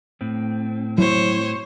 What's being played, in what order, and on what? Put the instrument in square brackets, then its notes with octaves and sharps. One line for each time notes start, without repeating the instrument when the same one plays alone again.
[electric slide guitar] A2 C4
[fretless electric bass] F#3 [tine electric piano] E4 [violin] C5 C#5